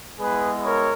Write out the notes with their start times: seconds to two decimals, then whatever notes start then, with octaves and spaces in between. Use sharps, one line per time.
0.20 G#3 B3 E4 G#4 B4
0.65 A#4 C#5